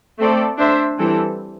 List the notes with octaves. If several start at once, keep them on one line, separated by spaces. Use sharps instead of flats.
A3 C4 A4 D5
D4 C5 E5
E3 G3 C4 A4